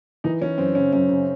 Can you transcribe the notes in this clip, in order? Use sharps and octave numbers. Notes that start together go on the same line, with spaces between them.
E3 D#4
E3 C#4
F#2 C4
C#3 C#4
F#2 C#4
C#3